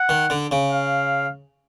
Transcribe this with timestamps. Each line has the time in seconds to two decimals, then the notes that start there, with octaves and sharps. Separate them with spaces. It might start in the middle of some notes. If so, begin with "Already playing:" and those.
Already playing: F#5
0.09 D#3
0.30 D3
0.51 C#3
0.72 F5